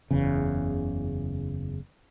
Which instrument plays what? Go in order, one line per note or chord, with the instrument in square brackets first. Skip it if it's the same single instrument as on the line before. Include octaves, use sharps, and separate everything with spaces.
[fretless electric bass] F#1 E2 C#3